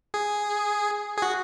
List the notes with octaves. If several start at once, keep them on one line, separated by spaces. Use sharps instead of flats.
G#4
G#4
F#4